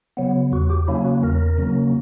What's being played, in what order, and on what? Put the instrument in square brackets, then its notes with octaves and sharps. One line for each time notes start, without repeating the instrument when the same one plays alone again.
[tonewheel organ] C#3 F#3 B3
E2 F#4
G4
C#3 F#3 A#3 C#4 E4
F#4
E2 A#4
C#3 F#3 A#3 C#4